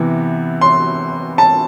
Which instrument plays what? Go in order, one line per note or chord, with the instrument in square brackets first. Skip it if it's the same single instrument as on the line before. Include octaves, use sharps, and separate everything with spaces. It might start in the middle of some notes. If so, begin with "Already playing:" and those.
Already playing: [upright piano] C3 E3 B3
C6
A5